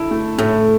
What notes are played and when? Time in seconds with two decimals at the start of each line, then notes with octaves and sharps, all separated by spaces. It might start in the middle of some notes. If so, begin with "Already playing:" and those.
Already playing: D3 E4 A4
0.11 A3
0.38 A2 A3